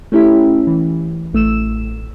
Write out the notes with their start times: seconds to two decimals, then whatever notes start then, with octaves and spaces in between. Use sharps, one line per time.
0.12 A3 C#4 E4 G4 E5
0.67 E3
1.33 A1 A3 E6 E7